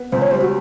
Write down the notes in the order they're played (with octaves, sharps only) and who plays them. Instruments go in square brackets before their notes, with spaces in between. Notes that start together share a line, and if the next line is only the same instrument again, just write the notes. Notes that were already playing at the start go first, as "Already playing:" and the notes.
Already playing: [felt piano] B3
[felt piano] C#2 [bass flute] C5
[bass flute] C#5
[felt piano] G3 [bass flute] C5
[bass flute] F#4